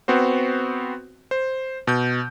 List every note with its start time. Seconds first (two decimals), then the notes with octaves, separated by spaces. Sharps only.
0.08 B3 C4 F#4 C5
1.31 C5
1.87 B2 G6